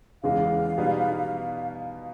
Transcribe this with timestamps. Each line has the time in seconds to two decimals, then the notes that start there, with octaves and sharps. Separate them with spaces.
0.23 E2 C#3 E3 G#3 F5
0.78 B2 G3 B3 D#4